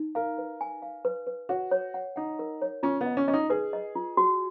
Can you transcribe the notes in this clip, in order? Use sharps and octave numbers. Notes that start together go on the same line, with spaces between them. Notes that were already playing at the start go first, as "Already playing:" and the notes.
Already playing: D#4
A#4 F5
B4
G#5
F5
B4
B4
F#4 C#5
C#5
F#5
D#4 F#5
A#4
C#5
C#4 F4
B3
D#5
C#4
C#4 D#5
D#4
G#4 B4
D#5
F4
F#4